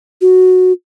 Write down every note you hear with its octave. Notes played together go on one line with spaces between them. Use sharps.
F#4